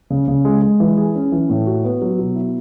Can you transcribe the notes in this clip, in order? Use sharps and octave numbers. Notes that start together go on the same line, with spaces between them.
C#3
C#3
G#3
G#3
E3
G#4
C#4
E3
A2
F#4
B3
F#3
B2
E4